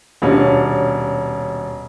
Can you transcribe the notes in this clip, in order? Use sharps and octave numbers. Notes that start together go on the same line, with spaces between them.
D#1 B2 C#4 D4